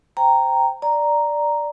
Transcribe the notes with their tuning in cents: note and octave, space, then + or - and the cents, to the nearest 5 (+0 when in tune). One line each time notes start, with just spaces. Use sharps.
C5 +0 G5 +0 A#5 -5
D5 +0 A#5 +0